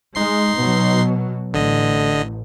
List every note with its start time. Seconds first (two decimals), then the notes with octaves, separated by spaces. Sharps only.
0.15 G#3 D#4 C6 C7
0.58 B2 F#3
1.54 A1 D3 D#5